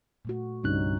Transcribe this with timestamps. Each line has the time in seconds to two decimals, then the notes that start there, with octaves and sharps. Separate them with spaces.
0.25 A#2 A3 F#4
0.63 C2 G2 D3 C#4 D#4 F#6